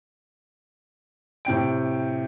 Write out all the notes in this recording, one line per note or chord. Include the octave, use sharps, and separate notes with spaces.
A2 C3 G5 D7